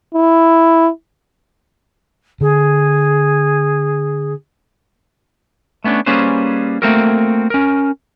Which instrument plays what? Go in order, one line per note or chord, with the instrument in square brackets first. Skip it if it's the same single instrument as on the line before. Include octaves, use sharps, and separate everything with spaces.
[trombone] E4
[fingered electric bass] D3 [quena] G#4
[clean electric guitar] A3 B3 C#4 D4
G3 A#3 C#4 G#4 B4 C5
A3 A#3 C4 F#4 A4 A#4
C#4 A#4